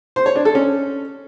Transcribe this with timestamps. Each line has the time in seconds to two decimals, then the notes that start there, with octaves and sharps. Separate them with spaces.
0.16 C5
0.26 C#5
0.36 D4
0.45 A4
0.55 C#4